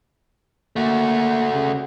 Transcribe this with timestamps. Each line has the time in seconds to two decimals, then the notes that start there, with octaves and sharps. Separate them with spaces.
0.76 A3 A#3 F#4
1.53 C#3